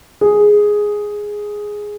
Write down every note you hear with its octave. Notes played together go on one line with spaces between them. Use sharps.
G#4